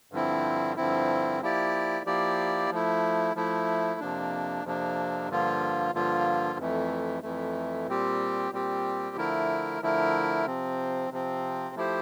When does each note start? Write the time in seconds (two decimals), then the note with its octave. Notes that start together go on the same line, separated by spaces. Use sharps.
0.12 G2 D3 F3 C4 E4
0.76 G2 D3 F3 C4 E4
1.41 F3 A#3 E4 G4 D5
2.06 F3 A#3 E4 G4 D5
2.70 F3 A3 E4
3.35 F3 A3 E4
4.00 F2 C3 F3 A#3 D4
4.64 F2 C3 F3 A#3 D4
5.29 G2 D3 F3 A#3 F4
5.94 G2 D3 F3 A#3 F4
6.59 F2 E3 A3
7.23 F2 E3 A3
7.87 A#2 G3 C4 G4
8.52 A#2 G3 C4 G4
9.16 D3 F3 A3 E4 A#4
9.82 D3 F3 A3 E4 A#4
10.46 C3 F3 C4
11.10 C3 F3 C4
11.75 F3 A3 E4 G4 C5